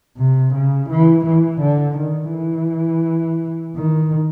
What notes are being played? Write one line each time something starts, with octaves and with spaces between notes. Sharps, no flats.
C3
C#3
E3
E3
D3
D#3
E3
D#3